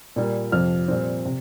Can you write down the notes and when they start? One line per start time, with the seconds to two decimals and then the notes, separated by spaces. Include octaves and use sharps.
0.16 A#2 G3 A#3
0.52 F2 C3 F3 F6
0.88 A#2 G3 C4
1.25 C3